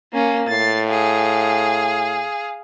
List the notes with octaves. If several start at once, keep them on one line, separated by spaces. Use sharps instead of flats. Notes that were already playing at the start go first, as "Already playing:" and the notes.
A#3 C#4
A2 A6 C7
G#4 F5